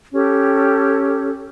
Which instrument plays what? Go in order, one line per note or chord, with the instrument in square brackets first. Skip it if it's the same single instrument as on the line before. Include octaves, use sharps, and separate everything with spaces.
[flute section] C#4 G4 A4